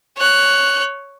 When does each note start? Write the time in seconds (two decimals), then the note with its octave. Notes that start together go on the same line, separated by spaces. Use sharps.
0.17 C#5 F#6